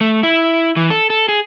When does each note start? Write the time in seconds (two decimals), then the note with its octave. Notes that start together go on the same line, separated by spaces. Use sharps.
0.01 A3
0.23 E4
0.76 E3
0.90 A4
1.10 A4
1.29 G#4